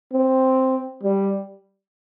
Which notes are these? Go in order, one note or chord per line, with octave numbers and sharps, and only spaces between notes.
C4
G3